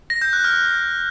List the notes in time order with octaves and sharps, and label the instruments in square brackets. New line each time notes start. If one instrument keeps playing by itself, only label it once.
[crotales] A#6
G6
F#6
F6